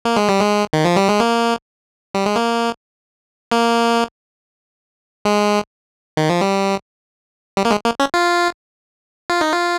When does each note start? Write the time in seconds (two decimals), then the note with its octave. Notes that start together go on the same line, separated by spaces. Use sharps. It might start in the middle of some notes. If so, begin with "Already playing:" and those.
0.05 A#3
0.17 G#3
0.29 G3
0.40 G#3
0.73 D#3
0.85 F3
0.96 G3
1.09 G#3
1.20 A#3
2.15 G3
2.26 G#3
2.36 A#3
3.52 A#3
5.25 G#3
6.17 D#3
6.29 F3
6.41 G3
7.57 G3
7.65 A#3
7.71 G#3
7.85 A#3
8.00 C#4
8.14 F4
9.30 F4
9.41 D#4
9.53 F4